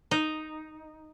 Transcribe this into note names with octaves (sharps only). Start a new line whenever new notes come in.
D#4